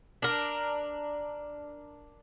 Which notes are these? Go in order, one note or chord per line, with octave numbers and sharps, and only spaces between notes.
D4 A#4